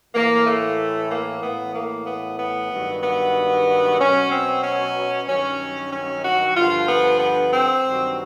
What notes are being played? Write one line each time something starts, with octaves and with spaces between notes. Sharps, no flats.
A2 E3 A#3
A3
A#3
A2 E3 B3
A#3
B3
B3
G2 D#3 F#3
B3
B2 F#3 C#4
C4
C#4
G2 D#3 F#3 C#4
C#4
F#4
G2 D3 F3 F4
B3
B3
C4
G2 D#3 F#3